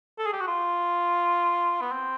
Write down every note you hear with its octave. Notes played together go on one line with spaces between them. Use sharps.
A4
G#4
G4
F#4
F4
B3
C4